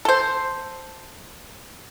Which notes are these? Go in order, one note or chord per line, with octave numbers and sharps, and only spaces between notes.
A4 C5